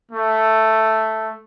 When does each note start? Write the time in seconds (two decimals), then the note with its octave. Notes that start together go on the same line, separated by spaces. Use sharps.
0.11 A3